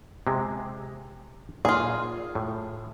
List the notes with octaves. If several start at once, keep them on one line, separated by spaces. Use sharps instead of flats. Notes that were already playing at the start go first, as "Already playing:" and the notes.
C3 G#3
A#2 F4 G#4
A2